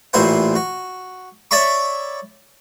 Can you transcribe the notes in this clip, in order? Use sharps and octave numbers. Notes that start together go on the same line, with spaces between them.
A1 A#2 E4 C5 F#5
F#4
C#5 D5 E5 B5 C#6